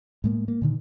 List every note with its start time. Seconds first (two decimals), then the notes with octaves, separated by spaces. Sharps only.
0.24 A2 G#3 A#3
0.48 A#3
0.62 A#2 D3 D#3